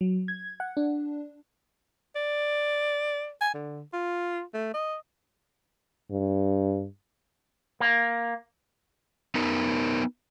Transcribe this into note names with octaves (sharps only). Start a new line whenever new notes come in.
F#3
G#6
F#5
D4
D5
G#5
D3
F4
A3
D#5
G2
A#3
B3 D#4 A#4